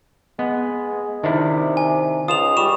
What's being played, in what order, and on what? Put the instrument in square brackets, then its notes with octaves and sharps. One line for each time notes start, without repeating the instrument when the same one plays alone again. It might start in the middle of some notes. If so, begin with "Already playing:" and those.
[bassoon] G#3 [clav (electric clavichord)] B3
[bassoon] C3 [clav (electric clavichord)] D#3 D4 E4
[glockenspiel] G#5
[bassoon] C#2 [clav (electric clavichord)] F4 [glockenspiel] D#6 E7 F7
[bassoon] G3 [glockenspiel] C#6 E7